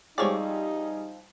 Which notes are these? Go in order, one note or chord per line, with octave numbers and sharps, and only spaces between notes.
F3 G3 C4 D#4 G#4 C#5 D5